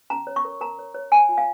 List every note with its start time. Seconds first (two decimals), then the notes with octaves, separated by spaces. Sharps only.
0.10 C#4 A#5
0.27 C#5
0.36 C#6
0.45 A#4
0.61 A#4 A#5
0.79 C#5
0.95 C#5
1.12 C#5 G#5
1.29 F4
1.38 F5